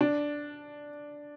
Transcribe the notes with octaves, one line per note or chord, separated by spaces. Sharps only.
D4